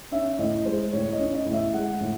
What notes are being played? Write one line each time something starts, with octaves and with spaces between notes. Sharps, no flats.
C#4 E5
A2 D#5
G#3 C5
A2 C#5
D#5
C#4
D#5
A2
E5
G#3 F#5
A2